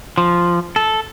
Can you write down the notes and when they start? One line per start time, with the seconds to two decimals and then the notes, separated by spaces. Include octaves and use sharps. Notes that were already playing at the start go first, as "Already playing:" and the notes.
0.18 F3
0.76 A4